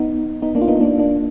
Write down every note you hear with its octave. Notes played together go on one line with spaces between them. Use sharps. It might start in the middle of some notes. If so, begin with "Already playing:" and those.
Already playing: B3 D#4
B3 D#4
A#3 D4
F4
B3 D#4
A#3 D4
A#3 D4